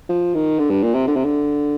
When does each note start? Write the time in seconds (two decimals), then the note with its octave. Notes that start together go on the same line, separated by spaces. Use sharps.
0.09 F3
0.35 D#3
0.59 D3
0.70 G2
0.83 A#2
0.95 C3
1.08 D3
1.16 C3
1.25 D3